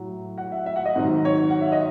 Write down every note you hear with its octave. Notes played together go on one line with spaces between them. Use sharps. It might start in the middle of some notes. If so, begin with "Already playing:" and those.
Already playing: A2 F#3
F#5
E5
E5
F#5
D#5
G#2 D#3 F#3
C#5
F#5
E5
D#5